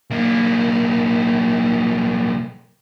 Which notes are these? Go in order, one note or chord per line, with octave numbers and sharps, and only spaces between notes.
B1 A#3